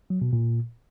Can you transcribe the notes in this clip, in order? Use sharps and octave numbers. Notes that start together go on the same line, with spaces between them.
F#3
B2
A#2